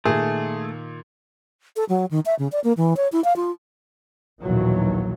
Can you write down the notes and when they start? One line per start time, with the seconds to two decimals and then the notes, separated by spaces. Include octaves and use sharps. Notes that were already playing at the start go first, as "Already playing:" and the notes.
0.05 A#2 D#3 A3 G#4
1.76 A4
1.89 F#3
2.11 D#3
2.26 E5
2.39 C#3
2.52 D5
2.64 A#3
2.77 E3
2.97 C#5
3.12 E4
3.24 F5
3.36 F4
4.41 A#1 D#2 B2 E3 F#3